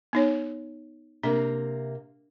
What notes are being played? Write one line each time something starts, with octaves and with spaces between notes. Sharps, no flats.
B3 D#4 C#5
C3 A#3 D4